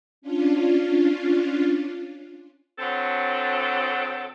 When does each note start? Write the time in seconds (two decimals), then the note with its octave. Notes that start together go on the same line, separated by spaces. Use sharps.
0.22 C#4 D4 F4
2.78 D3 F#3 C4 A4